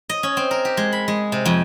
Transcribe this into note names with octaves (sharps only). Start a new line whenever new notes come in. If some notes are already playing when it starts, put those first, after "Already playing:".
D#5
C#4
C4
A#4
G4
G#3
B5
G#3
C3
F2